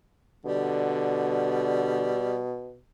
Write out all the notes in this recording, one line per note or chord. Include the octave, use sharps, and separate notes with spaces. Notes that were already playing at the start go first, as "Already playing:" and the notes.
B2 D3 G3